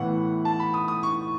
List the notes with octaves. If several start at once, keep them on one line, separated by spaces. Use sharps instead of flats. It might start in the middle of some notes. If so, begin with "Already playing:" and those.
Already playing: A2 E3 B3 F#5
A5
B5
D#6
D#6
C#6